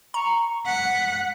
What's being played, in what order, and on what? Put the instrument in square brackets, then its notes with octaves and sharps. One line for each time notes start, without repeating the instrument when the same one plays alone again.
[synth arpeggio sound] A#5 [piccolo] C#6
[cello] F#5 [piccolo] B6